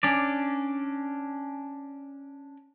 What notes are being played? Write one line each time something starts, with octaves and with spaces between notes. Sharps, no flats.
C#4 D4 D5